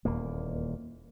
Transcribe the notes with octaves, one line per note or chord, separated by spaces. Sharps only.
D#1 E2 A#3